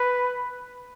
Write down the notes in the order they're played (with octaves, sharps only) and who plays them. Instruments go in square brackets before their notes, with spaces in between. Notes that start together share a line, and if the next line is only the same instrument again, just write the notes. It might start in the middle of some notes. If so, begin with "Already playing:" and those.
Already playing: [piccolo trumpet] B4